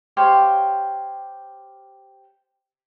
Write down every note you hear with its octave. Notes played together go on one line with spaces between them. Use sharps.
G4 C5 C#5 F5